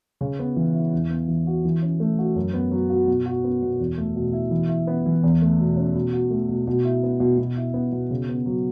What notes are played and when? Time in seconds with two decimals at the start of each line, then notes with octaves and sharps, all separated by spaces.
0.21 C#3
0.39 B3
0.56 E3
0.74 E4
0.93 E2
1.10 B3
1.28 E3
1.47 F#4
1.65 E3
1.82 C#4
2.00 A3
2.19 F#4
2.36 F#2
2.54 B3
2.71 F#3
2.90 F#4
3.08 B2
3.26 F#4
3.44 B3
3.62 B2
3.79 E2
3.98 A3
4.16 B2
4.33 E4
4.51 E3
4.69 E4
4.87 B3
5.06 E3
5.23 E2
5.42 A3
5.60 B2
5.77 C#4
5.94 B2
6.13 F#4
6.30 A3
6.49 B2
6.67 B2
6.85 E4
7.03 B3
7.20 B2
7.38 B2
7.57 E4
7.74 B3
7.92 B2
8.10 C#3
8.29 B3
8.46 F#3